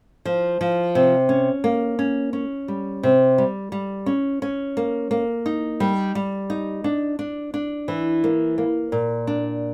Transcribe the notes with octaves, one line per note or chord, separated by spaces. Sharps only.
F3
F3
C3
C#4
A#3
C#4
C#4
G3
C3
G3
G3
C#4
C#4
A#3
A#3
D#4
G3
G3
D#4
D4
D4
D4
E3
A#3
A#3
A#2
D4